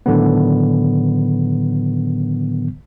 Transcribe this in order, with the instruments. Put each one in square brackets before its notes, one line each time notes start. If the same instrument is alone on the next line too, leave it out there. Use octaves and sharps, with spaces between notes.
[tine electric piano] A2 D3 D#3 F#3 B3